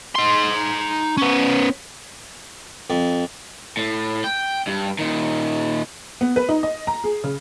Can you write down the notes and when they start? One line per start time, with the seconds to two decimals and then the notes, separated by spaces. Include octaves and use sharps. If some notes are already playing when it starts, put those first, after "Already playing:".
0.15 D#4 C6
1.17 B3 C#4
2.90 F2
3.77 A2
4.24 G5
4.67 G2
4.99 A#2 D#3
6.21 B3
6.36 B4
6.49 D#4
6.63 D#5
6.87 A#5
7.04 G#4
7.24 C#3